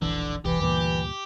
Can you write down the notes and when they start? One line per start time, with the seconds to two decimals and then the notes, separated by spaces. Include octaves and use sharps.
0.02 E1 A#1 D3 E3
0.45 E1 C2 E3 G4
0.61 D2 G2 A#2 E3